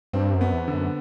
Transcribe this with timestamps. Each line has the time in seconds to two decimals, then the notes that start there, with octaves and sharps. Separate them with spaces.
0.13 G2 C4
0.34 F#2
0.41 B3
0.54 E2
0.68 D3
0.74 F#2